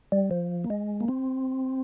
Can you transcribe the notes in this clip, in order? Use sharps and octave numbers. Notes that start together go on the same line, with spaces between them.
G3
F3
A#3
G#3
A#3
C4